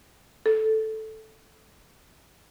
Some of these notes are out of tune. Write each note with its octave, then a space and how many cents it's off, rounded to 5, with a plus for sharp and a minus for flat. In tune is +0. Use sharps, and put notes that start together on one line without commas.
A4 -5